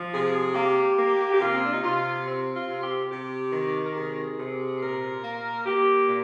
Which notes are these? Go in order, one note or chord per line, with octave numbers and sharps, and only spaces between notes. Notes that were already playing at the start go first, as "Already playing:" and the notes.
Already playing: F3
C3 G#4
A#3 G4
A#3
G4
C3 F4
C4
D4
D#4
C3 F4
C4
F4
C3
G4
C3 G4
D#3
A#4
C3 G#4
C3
A#2 A#4
A#3
A#3 G4
A#2